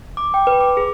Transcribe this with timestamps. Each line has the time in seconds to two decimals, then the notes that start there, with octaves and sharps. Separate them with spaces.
0.17 D6
0.34 G5
0.47 B4
0.60 D6
0.77 G#4